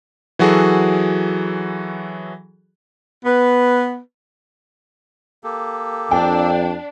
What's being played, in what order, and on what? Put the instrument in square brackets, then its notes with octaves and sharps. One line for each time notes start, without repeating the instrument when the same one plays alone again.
[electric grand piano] E3 F#3 F#4 G#4 A4
[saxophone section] B3 B4
[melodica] A#3 G4 A4
[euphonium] F2 [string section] D4 [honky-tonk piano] G5